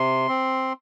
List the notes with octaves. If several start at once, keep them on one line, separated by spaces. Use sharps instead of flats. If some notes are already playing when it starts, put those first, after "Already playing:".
Already playing: C3 C6
C4